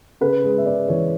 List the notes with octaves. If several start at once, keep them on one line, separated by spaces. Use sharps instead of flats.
C#3 B4
G#3
E5
C#3 D5
E3 C#5